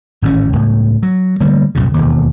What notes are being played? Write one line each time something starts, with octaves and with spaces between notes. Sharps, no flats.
G#1 A2 E3 C#4
C#2 A2
F#3
D3 G3 A3 A#3
C2 F#2 A#2 C#3
E1 D#2